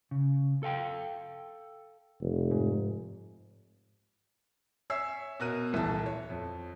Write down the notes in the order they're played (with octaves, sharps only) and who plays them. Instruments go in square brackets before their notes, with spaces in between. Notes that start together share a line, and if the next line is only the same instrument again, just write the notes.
[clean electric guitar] C#3
A4 F5 G5
[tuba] F1
[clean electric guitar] G#2
[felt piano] C#5 E5 G#5 E6 C7
B2 A#4 F#6 D#7
D#1 C2 E3 E5 A5
C#5
F2